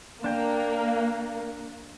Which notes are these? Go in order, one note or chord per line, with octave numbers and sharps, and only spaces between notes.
A#3 D4 G5